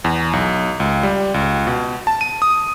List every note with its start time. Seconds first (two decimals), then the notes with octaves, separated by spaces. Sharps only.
0.04 E2
0.33 B1
0.80 C#2
1.03 G3
1.34 C#2
1.67 B2
2.07 A5
2.21 D#7
2.42 D#6